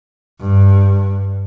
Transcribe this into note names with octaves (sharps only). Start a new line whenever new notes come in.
G2